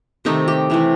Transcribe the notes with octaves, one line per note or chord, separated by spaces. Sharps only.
C3 D#3 A3 D#4
G4
C3 E3 A3